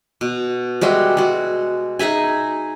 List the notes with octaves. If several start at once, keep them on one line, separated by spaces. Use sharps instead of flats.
B2
G3 G#3 F#4 E5
G#3 F#4
D#4 G#4 E5 G#5